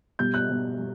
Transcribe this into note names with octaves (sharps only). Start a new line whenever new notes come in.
B2 G3 G6
F#6
B2 G3
G3